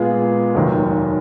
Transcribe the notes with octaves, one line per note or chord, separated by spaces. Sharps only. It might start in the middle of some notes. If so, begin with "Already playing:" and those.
Already playing: A#2 G#3 B3 F4 G#4
F1 D#2 D#3 F#3